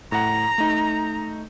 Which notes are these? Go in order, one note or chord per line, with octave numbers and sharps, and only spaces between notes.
A2 F#5 A#5
A3 D#4